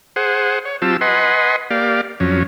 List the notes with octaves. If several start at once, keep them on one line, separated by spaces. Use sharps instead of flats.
G#4 C5 F#5
C#5
F#3 C4 F4 G4 A5 E6
B4 D#5 F#5 G#5 C6
A#3 G4 D5 F5
F2 F#3 C#4